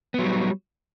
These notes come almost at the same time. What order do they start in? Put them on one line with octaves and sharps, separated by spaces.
B3 F#3 G3